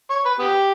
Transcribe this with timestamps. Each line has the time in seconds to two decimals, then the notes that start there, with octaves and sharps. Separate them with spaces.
0.10 C#5
0.25 B4
0.39 B3 G4